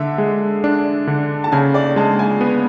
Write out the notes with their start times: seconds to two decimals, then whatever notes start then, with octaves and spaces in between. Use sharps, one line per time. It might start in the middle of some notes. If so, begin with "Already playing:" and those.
Already playing: D3 E5
0.18 G#3
0.64 D4
1.07 D3
1.44 A5
1.52 C#3 G#5
1.74 D5
1.96 G#3 A5
2.19 G#5
2.41 B3